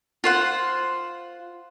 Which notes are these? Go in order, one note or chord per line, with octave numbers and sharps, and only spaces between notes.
F4 C5 F#5